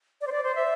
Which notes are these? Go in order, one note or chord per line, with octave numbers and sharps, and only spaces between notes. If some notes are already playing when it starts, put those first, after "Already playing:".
D5
C5
D5
C5
E5